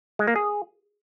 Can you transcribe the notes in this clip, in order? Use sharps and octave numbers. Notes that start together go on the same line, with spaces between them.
G#3
A#3
G#4